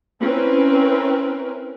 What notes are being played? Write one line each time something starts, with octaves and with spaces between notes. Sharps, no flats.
C4 C#4 E4 A#4 B4